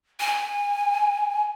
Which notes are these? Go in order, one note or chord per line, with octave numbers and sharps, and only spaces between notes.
G#5